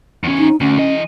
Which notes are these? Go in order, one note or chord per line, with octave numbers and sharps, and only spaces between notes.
E2 C#4
D#4
D2 C#4
E3 D#5